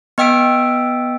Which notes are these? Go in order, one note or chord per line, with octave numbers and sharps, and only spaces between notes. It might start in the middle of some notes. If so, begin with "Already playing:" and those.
B3 D#5 G5 E6 B6 D7